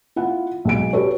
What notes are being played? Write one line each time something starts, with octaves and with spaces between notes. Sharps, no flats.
E4 F4 F#5
B1 G#3 D7
F#4 G4 A4 B4 C#5